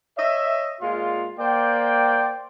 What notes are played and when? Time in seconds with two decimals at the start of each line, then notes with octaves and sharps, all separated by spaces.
0.17 C#5 D#5 E5
0.81 A#2 G#3 F4
1.39 A#3 C5 D5 G5